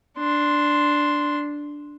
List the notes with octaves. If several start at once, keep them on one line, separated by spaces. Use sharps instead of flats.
D4 C6